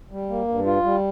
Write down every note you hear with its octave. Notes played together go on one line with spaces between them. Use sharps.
G3
A#3
G2
F4
G3